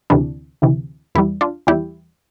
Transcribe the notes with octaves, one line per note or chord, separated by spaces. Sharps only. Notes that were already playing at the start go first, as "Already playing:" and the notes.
D2 C3 E3 D4
D2 C3 E3
E2 E3 G3 E4
D4 F4
E2 E3 G3 E4 G4